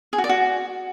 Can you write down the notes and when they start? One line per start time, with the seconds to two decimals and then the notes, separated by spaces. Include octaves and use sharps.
0.13 G#4
0.18 F#4
0.24 D5
0.29 F#4